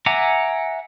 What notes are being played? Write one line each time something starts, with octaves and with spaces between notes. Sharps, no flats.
E5 F#5 G#5 A#5 D6